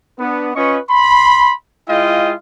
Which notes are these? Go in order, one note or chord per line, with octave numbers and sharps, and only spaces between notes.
B3 D4 B4
C#4 F4 B4 D#5 C#6
B5 C6
G#3 E4 F4 D#5 F5 G5